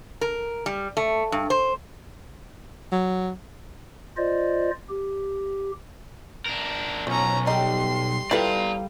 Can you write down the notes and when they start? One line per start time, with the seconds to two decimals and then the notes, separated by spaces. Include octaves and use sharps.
0.21 A#4
0.66 G3
0.97 A3
1.32 G2
1.50 C5
2.92 F#3
4.17 F4 C5 D5 D#5
4.89 G4
6.46 D4 A#4
7.07 B1 F3 C#4 A#5
7.47 G3 D#4 G4 C6
8.31 G3 E4 F4 A4 B4 D5 A#5